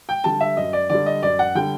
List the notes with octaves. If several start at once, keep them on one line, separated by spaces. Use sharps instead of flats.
G5
D3 G3 A5
E5
F#2 D#5
D5
D3 G3 D5
D#5
F#2 D5
F#5
D3 G3 G5